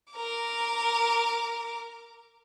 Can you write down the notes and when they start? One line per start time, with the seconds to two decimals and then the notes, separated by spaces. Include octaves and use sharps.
0.13 A#4 D6